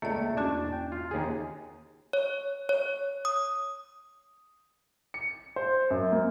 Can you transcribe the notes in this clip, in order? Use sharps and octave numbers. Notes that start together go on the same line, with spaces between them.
C#2 A3 A#3 D5
E2 C#4 D4 F#4
G5
F4
D#2 G#4
C#5
C#5
D#6
C#7
C5
F#2
A#3